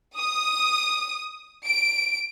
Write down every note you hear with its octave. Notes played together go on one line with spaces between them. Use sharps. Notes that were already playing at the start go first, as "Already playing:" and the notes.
D#6
D7